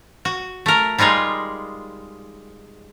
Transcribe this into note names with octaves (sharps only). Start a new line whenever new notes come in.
F#4
A3 A#4
G3 G#3 D#4 F4 G#4